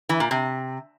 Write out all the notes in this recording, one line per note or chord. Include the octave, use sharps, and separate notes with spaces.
E3
A#2
C3